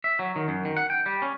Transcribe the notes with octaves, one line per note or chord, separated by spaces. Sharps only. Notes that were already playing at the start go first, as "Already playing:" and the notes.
E5
F#3
D#3
F#2
D#3
F#5
G5
G3
C#4